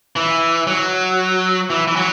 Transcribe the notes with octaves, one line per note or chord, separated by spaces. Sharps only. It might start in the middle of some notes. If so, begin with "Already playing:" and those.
E3
F#3
E3
E3
F#3